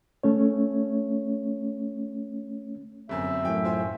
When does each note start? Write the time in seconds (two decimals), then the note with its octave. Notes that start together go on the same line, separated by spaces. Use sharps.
0.23 A3 C#4 C#5
3.09 G1 F#2 C4 E5
3.45 F#2 A2 E3 G5 G#5
3.64 F4 C5 G#5
3.80 D#2